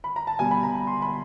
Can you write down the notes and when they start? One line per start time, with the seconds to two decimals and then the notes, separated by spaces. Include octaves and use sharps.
0.04 B5
0.16 A#5
0.27 A5
0.39 B2 G3 G#5
0.51 B5
0.63 A#5
0.75 B5
0.87 C6
1.02 B5